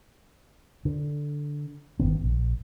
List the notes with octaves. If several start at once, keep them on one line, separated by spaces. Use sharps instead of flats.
D3
G1 D#3 B3
A#1